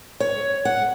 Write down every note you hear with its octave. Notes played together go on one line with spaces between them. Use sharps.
C#5
F#5